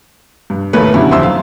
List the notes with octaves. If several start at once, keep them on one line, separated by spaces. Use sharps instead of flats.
G2
A1 D#2 A3 A#3 B4 C#5
B2 D3 F#3 C#4 E4 G4
D#1 F2 C5 E5 C6 E6
F5